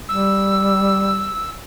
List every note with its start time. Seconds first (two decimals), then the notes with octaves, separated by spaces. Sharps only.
0.08 G3 E6